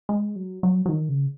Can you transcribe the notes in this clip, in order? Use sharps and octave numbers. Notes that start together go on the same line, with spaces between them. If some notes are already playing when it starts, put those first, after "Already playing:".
G#3
F#3
F#3
F#3
D#3
C#3